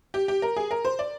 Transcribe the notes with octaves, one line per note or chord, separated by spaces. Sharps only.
G4
G4
A#4
G#4
A#4
C5
D5